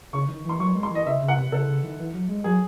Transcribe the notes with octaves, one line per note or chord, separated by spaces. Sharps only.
C#3 C#6
D#3
E3 C6
F#3 C#6
G#3
C6
E3 D#5
C#3 E5
C#3
F#5
C3
C#3 A4
C#3
D#3
E3
F#3
G#3
F#3 G#4